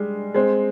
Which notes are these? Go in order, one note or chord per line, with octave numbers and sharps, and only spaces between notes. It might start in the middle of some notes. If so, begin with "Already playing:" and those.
Already playing: G3 G#3
G#3 C4